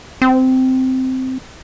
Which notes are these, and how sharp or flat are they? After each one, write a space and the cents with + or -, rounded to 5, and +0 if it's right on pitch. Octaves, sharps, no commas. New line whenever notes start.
C4 -10